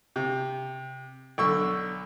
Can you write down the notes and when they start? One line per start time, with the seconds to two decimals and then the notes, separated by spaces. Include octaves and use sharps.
0.16 C3
1.38 B1 D3 C#6 E6